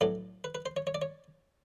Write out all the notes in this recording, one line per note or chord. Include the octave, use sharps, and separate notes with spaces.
A2 F#3 B3 D4 A4
B4
B4
C5
C#5
C#5
D5
C#5